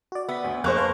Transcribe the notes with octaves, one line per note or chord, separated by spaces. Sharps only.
F#4 D5
B3 E5 B6
D2 E5
F2 A#3 G#4 C5 C#6 F#6
B4 F5 A5